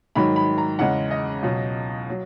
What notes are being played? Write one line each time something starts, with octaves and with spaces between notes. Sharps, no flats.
G#2 D#3 F#3 B5
B5
A#5
E2 C#3 G#3 F#5
D#5
C#2 B2 F#3
F#3